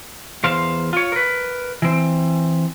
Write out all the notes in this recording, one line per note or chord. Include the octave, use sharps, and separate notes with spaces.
E2 C5 F5
F4 C#5
A#4 B4
E3 C4